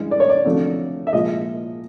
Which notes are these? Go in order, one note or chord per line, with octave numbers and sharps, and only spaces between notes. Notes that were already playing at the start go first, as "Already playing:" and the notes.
Already playing: G2 E3 G#3
D5
C#5
D5
F2 D3 F#3 A3
E5
A#2 F3 G#3 D#5